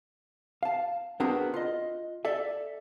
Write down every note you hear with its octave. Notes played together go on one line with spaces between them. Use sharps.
F5 A5
B3 C4 D4 F#4 G#4 A#4
F4 D#5
A4 D5 E5